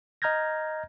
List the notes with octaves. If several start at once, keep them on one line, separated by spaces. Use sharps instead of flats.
D#5 A#5 F6 G6 G#6 A#6